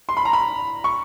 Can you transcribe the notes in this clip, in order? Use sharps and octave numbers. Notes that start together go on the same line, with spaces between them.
C6
B5
A#5
B5
C#6